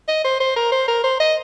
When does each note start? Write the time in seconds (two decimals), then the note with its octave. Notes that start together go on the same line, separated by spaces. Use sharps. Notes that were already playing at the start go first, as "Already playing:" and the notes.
0.08 D#5
0.25 C5
0.40 C5
0.56 A#4
0.72 C5
0.88 A#4
1.04 C5
1.20 D#5